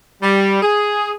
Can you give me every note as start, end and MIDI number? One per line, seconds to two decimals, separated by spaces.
0.22 0.61 55
0.62 1.13 68